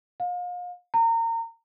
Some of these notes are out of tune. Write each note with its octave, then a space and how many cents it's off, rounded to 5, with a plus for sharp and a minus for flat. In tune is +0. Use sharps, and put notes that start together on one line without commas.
F5 +35
A#5 -30